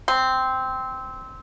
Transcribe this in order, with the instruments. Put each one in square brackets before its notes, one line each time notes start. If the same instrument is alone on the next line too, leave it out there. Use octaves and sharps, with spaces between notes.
[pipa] C4